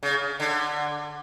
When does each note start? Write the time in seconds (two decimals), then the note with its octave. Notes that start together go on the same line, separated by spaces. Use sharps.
0.03 C#3
0.40 D3